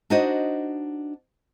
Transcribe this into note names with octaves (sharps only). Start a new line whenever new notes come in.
D4 D#4 F#4 C5 D#5